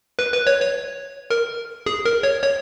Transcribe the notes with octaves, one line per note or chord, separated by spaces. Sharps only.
B4
B4
C#5
C#5
A#4
G#4
A#4
C#5
C#5